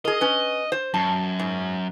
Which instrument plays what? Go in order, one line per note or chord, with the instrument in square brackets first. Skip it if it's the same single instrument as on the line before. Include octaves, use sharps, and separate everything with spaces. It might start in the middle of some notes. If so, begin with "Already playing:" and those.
[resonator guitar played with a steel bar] G#4 A#4 [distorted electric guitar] D#5
[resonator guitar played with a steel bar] C#4 B4
C5
[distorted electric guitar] F#2 [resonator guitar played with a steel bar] A5
[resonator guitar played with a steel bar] G#2